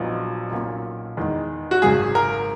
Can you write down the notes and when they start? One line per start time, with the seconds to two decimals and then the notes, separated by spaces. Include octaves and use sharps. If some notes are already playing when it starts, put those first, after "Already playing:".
Already playing: A#1 A#2 F#3 B3 D#4
0.52 B1 A#2 A#3 C#4
1.17 E2 D#3 G#3
1.71 F#4
1.82 G#1 F#2 C#3 G#4
2.15 A#4